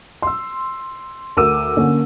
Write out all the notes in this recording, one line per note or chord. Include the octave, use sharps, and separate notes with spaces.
C6 E6
D2 A#4 D6 E6 D#7
D3 A#3 C#4